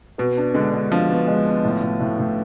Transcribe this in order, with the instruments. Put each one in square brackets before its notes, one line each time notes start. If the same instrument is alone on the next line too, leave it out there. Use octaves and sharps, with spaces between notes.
[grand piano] B2 [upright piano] B3
[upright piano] D4
[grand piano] D3 [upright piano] G#3
[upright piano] G#3
[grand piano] F3 [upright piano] D4
[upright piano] B3
G#3
B3
A2
A2
A2
A2